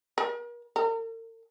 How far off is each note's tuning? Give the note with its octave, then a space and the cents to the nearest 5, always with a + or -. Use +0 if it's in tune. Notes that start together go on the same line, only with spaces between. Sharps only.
A#4 +40
A#4 -45